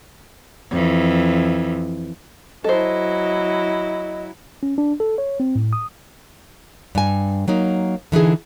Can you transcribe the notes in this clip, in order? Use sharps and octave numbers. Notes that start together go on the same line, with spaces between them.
F2 E3
F#3 E4 A4 C5 D#5
C#4
D4
A4
C#5
C4
A2
D#6
G2 G#5
F#3 A#3 D#4
D3 E3 D#4 G#4